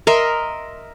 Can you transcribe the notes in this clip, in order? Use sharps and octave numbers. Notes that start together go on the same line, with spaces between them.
A#4 D#5 E5 C6